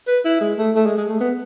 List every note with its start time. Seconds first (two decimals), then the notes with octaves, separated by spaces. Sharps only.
0.08 B4
0.25 E4
0.41 G#3
0.58 A3
0.76 A3
0.86 G#3
0.98 G#3
1.09 A3
1.20 B3